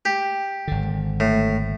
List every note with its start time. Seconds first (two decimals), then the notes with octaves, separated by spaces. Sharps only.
0.05 G4
0.68 G#1 D3
1.20 A2